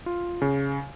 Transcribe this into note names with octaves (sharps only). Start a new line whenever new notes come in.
F4
C#3